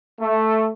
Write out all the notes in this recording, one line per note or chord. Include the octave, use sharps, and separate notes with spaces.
A3